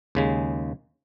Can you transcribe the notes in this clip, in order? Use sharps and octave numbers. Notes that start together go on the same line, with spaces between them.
D#2 C#3 G#3